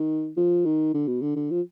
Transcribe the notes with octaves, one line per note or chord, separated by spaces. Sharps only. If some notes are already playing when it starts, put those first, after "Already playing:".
Already playing: D#3
F3
D#3
D3
B2
D3
D3
F3